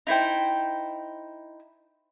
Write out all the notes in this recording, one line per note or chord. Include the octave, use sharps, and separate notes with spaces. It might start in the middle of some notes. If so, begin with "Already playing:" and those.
D#4 E4 C5 G5